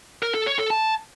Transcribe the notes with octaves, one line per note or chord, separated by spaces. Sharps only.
A#4
A4
C#5
A4
A5